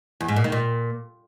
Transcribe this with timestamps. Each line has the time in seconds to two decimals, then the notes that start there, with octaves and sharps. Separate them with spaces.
0.21 E2
0.28 G#2
0.36 A#2
0.44 D#3
0.52 A#2